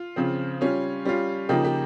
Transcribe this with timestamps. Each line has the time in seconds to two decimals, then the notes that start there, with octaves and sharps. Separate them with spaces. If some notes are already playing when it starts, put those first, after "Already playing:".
Already playing: F4
0.16 C#3 F3 C4
0.61 G3 C#4 F4
1.05 G3 C#4 F4
1.49 C#3 F3 A#3 D#4 G4
1.64 G4